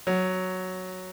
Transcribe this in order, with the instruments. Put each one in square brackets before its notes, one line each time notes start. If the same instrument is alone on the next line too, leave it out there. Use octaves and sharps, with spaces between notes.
[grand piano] F#3